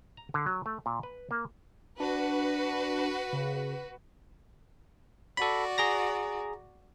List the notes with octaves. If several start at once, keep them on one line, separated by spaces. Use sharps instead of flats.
A#5
D3
F#3
A3
A#2
B4
A#3
D4 F#4 B4
C#3
F#4 A4 D5 B5
G#4 A#5 A#6